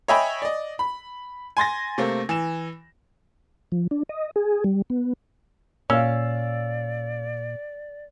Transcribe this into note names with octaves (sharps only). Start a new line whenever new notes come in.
C#5 D#5 E5 G5 G#5 B5
D5 D#5
B5
G#5 C6 A6 A#6
C3 A3 A#3 C4
E3 E7
F3
D4
D#5
G#4
G3
B3
A#2 C#4 D5 F5 E6